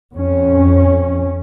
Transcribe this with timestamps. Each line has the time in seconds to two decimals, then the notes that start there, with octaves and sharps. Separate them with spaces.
0.14 F2 C#4